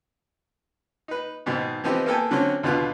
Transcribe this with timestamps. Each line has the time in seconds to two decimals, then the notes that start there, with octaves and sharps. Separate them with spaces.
1.08 D#4 B4
1.46 G#2 B2 D#3
1.84 E3 F3 B3 C4 D#4 G4
2.06 A#3 B3 A4 G5 G#5
2.31 D3 F#3 C4 C#4
2.63 D#2 B2 D3 B3 F4 F#6